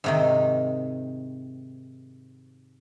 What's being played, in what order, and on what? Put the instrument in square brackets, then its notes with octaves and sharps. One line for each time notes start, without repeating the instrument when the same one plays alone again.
[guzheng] G#2 C3 D#3